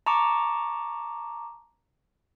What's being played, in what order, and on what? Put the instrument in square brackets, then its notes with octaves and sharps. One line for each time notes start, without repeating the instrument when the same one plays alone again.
[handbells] A5 A#5 C#6 D6